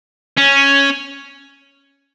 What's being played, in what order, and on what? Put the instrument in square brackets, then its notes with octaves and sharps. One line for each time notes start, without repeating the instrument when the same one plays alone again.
[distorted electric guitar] C#4